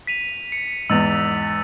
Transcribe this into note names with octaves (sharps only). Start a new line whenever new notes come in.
B6 D#7 F7
C#7
E2 G#2 E6 A6 F7